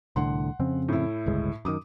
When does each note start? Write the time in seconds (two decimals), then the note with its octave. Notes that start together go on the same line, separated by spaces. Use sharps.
0.16 C2 A2 D3 F#5 C6
0.60 F2 C#3 C4
0.89 A2 E4
1.26 G1 C#2 G#3
1.65 F#2 D#3 D6 D#6